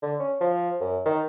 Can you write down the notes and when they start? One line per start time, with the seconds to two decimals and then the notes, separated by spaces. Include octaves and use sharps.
0.02 D3
0.20 C#4
0.41 F3
0.81 F#2
1.06 D#3